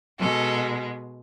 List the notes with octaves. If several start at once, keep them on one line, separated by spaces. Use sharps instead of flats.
B2 G#3 A4